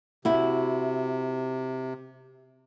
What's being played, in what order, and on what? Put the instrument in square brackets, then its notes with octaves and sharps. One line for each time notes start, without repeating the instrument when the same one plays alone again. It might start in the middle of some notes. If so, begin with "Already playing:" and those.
[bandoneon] C3 [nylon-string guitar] E4 F#4